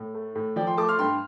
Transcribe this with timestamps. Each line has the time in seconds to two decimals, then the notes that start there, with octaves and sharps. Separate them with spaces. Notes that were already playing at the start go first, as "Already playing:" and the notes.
Already playing: A2
0.14 A3
0.35 A2
0.56 F3 D5 G5
0.67 G5 C6
0.77 A3 A5 D6
0.89 C6 F6
0.99 G2 G5 C6